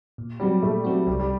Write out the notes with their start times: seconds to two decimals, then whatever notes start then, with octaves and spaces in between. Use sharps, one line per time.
0.18 A#2
0.40 F#3 G3 C4 F#4
0.62 A#2 A3
0.84 F#3 C4 F#4
1.07 C2 G3
1.20 G3